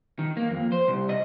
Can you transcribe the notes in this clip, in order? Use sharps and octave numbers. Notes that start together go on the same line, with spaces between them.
D#3
A#3
F2
C5
C2
D#5